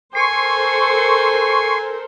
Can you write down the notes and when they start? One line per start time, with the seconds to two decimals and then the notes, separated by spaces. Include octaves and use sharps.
0.15 A4 A#4 C5 G#5 C6 C#6